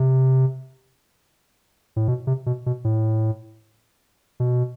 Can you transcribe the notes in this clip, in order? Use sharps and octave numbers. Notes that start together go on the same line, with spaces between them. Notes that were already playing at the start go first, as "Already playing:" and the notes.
Already playing: C3
A2
B2
C3
B2
B2
A2
B2